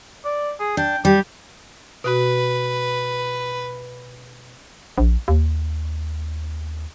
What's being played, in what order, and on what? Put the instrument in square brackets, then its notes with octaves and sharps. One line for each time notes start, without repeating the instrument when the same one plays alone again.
[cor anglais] D5
G#4
[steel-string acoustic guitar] D4 [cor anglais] G5
[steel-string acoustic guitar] G3 [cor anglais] G4
[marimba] B2 F#4 [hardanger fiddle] B4
[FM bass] A#1
D#2